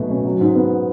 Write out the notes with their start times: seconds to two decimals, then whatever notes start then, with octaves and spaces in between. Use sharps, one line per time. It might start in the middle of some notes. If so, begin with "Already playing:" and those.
Already playing: B2 F#3 A3
0.10 C#4
0.25 F#3
0.41 G#2
0.55 B3